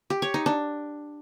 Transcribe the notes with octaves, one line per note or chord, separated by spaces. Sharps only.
G4
C#5
D#4
D4